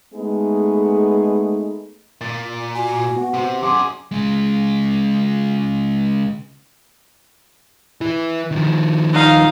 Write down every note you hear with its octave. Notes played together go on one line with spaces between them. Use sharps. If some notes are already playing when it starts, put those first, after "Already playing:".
G#3 A3 B3 D#4 G#4
A#2 A6
F#4 G#5
B3 F#5
C3
F#2 G#4 F#5 C6 D6
C#3 G#3
E3 E4
D#3 F3
D#4 F5